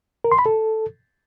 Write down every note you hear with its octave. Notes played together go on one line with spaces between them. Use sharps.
A#4
C6
B5
A4